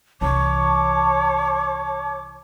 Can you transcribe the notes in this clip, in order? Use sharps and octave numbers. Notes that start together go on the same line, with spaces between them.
C2 E3 C#5 A5 D6